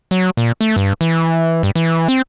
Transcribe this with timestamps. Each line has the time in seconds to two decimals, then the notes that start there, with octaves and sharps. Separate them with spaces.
0.11 F#3
0.37 A#2
0.61 A3
0.76 G2
1.01 E3
1.63 G2
1.75 E3
2.08 C4